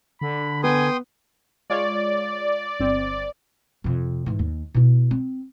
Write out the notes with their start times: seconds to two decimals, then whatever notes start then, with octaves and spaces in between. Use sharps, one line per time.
0.21 D3 B5
0.63 B3 G5 G#5 C6 D#6
1.70 G#3 F4 C#5 D5
2.79 G1 C4
3.84 F2 C3
4.26 G#2 E3
4.39 D#2
4.74 B2 E4
5.11 C4